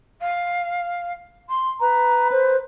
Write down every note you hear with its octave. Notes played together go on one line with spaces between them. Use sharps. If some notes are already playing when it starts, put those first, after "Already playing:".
F5
C6
B4 A#5
C5